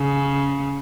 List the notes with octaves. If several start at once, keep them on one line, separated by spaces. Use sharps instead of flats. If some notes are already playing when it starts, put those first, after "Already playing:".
Already playing: C#3